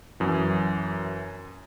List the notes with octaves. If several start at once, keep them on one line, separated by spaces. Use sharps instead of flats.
F#2 E3